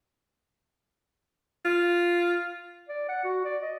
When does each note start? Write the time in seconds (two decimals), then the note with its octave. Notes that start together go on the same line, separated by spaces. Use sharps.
1.65 F4
2.88 D5
3.09 F#5
3.24 F#4
3.45 D5
3.63 D#5